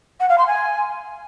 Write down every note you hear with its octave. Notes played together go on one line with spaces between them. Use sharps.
F#5
F5
C6
G#5